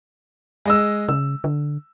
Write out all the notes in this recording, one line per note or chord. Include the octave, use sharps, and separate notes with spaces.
G#3 D#5 E6
C#3 E6
D3